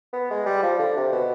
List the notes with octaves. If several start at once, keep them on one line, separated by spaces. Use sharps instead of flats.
B3
G#3
G3
F3
D3
C3
B2